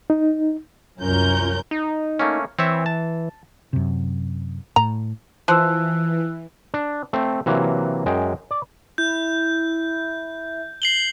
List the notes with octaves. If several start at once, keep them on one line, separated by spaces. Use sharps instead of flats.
D#4
C2 F#2 C#4 F4 A#4 G6
D#4
A3 A#3 C#4
E3 C4 C#5 E5
A5
F#2 C3
A2 A#5
E3 F3 E6 F#6
D4
A3 C4
C3 E3 F#3 A#3
F#2 G#3 G5
D5
E4 G6
C7 F#7 G7